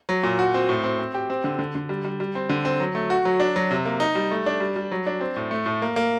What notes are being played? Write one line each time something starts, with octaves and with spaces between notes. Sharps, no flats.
F#3
A#2
F#4
C4
A2
C4
C4
G4
C4
D3
D3
D3
G3
G3
G3
C4
D3
C4
F#3
A3
F#4
F#3
D4
F#3
C3
A#3
D#4
G3
A3
D4
G3
G3
F#3
D4
C4
A2
A3
A2
A#3
A#3